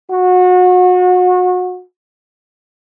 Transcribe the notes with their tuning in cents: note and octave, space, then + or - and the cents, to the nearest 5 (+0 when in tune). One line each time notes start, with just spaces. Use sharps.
F#4 -30